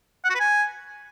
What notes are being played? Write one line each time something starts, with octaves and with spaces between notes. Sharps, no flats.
F#5
F#4
B4
G#5